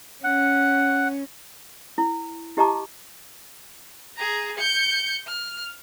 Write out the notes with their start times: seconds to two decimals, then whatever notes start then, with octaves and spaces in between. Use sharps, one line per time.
0.24 C#4 F#5
1.98 E4
2.57 E4 G4 D#5 A5 A#5 D6
4.16 G#4 A#5
4.57 G6 C#7
5.27 F6